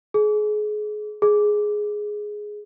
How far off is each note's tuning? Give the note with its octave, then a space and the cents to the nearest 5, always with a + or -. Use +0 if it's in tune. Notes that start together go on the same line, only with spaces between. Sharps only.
G#4 +30
G#4 +5